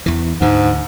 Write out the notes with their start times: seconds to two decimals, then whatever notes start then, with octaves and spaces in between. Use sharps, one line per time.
0.06 E2 E3
0.41 D2 G#2 D3